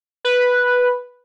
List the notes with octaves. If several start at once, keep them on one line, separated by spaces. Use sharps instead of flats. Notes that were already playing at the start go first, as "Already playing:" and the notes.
B4